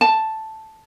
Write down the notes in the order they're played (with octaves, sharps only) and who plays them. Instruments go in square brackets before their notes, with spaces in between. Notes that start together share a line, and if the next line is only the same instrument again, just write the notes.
[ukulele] A5